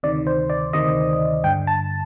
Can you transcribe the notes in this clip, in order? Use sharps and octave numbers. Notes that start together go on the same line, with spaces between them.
D2 C3 D#3 D5
C5
D5
D2 C3 D#3 D#5
G2 D3 G5
A5